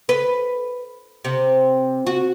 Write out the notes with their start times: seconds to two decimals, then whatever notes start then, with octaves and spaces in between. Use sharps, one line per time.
0.09 B4
1.25 C3
2.07 F#4